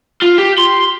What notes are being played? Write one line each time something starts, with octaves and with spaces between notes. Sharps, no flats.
F4
G4
C6